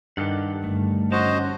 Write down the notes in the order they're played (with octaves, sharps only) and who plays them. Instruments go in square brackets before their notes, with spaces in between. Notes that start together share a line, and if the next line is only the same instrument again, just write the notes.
[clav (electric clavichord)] G2 D#3 [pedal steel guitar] G4 A4 F#5
[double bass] G1 G3 [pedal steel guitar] A3
[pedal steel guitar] C#4 G4 A5 [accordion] F#4 C5 D#5